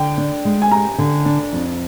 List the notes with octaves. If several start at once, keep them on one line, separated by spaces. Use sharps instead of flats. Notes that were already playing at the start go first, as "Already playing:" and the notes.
Already playing: D3 G5
D4
G#3
G#5
G4 A#5
D3
D4
F2